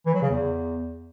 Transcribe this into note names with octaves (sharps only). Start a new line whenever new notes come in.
E3
F#3
C#3
E2